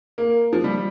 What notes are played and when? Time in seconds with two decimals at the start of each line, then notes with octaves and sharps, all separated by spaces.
0.18 A#3
0.53 F3
0.64 G3